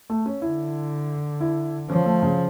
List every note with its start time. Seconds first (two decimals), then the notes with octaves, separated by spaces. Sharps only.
0.10 A3
0.26 C#4
0.42 D3 E4
1.40 E4
1.89 F3 C#4
2.06 A3
2.23 C#3